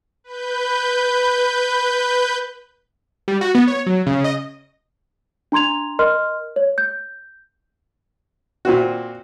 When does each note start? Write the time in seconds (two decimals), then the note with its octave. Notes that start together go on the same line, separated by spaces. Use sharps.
0.24 B4 G6
3.28 G3
3.41 F#4
3.55 B3
3.68 C#5
3.87 F#3
4.07 C#3
4.24 D#5
5.52 D4 A#5 C6 G#6 F7
5.99 A#4 D#5 C6 F6
6.56 C#5
6.78 G6
8.65 A#2 C4 F#4